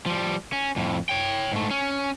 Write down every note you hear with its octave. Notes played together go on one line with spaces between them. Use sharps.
F3 G3
C#4
F2 A2
C#5 G5
G#2 A3
C#4